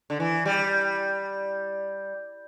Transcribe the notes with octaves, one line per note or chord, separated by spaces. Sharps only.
D3
E3
G3